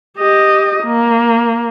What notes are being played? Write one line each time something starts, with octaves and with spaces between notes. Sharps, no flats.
G4 D#5
A#3